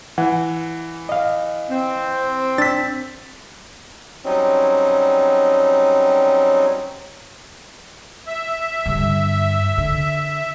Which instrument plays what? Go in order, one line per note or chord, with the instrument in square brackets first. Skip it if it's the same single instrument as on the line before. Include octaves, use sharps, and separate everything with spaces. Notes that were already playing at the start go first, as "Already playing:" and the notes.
[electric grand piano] E3 [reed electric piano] F#5
[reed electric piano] D#5 F5
[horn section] C4
[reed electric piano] D4 E6 [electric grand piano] A6 B6
[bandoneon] F#3 G3 C4 C#4 D#4
[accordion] E5
[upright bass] G2 D3
D3